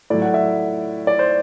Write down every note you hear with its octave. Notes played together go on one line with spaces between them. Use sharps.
A2 F#3 D5
F#5
E5
D5
C5